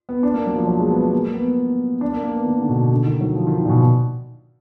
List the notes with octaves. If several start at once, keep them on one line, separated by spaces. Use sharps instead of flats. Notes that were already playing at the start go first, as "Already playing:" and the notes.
B3
D4
A#3
F#3
F3
F#3
G#3
B3
B3
A#3
B3
D4
A#3
A#3
B3
D#3
D3
B2
D3
D#3
F#3
F3
D#3
D#3
A#2
B2